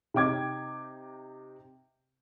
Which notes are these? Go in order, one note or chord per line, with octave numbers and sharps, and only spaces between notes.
C3 D#4 G5 D6 G#6